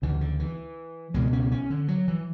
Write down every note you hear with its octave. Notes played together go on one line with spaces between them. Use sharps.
D2 C#3 E3
D3
E3
C#2 B2 G#3
C#4
C#4
D3
F#3
E3